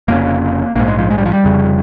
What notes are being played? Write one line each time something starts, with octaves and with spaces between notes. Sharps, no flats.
F1 F2 C#3 A#3
A#1 G#2 A#3
G#3
F3
G#3
G3
F3
G3
F1 F2 C#3